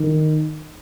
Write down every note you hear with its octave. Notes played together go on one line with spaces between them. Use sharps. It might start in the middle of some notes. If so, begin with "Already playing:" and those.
Already playing: D#3